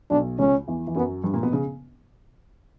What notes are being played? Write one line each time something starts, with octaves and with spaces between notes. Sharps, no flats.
B1 B2 D4
C#2 C#3 C#4
E2 E3
E3
F#2 F#3 B3
G2 G3
A#2 A#3
B2 B3
C#3